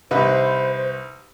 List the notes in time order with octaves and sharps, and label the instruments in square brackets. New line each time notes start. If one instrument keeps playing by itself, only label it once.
[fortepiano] C2 D#4 B4 [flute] C5